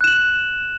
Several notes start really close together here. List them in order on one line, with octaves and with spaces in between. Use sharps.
F#6 E7 F#7